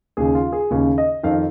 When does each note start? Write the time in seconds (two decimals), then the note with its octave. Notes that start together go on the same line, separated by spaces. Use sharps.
0.17 D#2 C#3 G#4
0.35 F4
0.52 G#4
0.70 D#2 C#3
0.98 D#5
1.23 F2 D#3 F5